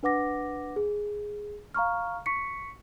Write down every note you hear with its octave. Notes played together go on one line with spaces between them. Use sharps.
D4 B4 F#5 D6 A#6
G#4
F5 A#5 C#6 F6
C#6 B6 C#7